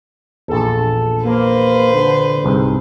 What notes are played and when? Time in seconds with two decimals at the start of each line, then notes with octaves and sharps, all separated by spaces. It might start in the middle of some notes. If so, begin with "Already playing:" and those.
0.48 A#1 E2 A4
1.25 A#3 B4 C5
1.94 D3
2.44 C2 G#2